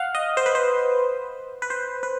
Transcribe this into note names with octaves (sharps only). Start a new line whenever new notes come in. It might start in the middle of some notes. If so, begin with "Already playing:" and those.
Already playing: F5 F#5
D#5
C5
B4
C5
B4
C5
B4